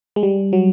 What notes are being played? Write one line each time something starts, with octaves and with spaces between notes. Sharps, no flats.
G#3
G3
F#3